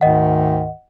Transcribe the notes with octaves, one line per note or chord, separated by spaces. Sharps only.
D2 G#2 D#3 D#5 F#5